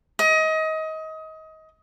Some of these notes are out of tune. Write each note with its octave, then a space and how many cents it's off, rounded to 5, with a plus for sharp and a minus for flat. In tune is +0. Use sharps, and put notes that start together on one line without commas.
D#5 +25